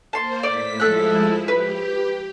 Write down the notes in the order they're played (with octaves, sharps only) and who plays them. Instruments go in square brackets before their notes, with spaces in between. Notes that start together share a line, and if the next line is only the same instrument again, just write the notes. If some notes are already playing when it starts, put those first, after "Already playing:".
[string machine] A#3 C5 [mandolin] A5 C6
[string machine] A2 B6 [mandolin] D5
[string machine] F3 G#3 E4 [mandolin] A4 F#6
[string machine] G4 [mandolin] B4